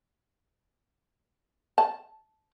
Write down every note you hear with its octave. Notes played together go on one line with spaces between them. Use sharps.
A5